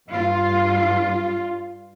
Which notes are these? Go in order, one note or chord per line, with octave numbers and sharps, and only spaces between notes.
G2 F4